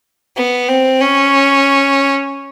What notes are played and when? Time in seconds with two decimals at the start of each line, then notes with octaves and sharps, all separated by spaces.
0.37 B3
0.68 C4
1.00 C#4